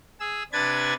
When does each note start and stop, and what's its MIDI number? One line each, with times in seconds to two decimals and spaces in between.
0.20 0.43 68
0.20 0.43 88
0.53 0.94 48
0.53 0.94 62
0.53 0.94 71
0.53 0.94 92
0.53 0.94 93